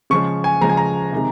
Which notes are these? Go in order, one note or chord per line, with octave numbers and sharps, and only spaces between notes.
C#3 F3 G#3 C#6
G#5
C#3 F3 G#3 A#5
G#5
A#5
C3 D#3 G#3